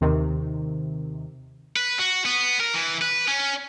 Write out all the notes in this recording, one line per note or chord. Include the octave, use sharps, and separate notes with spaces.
D#2 C3 D#3
B4
F#4
B3
A#4
E3
B4
C#4